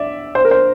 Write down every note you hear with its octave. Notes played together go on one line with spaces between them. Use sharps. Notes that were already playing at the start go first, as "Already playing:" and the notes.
Already playing: D5 E5
C5
A#4
C5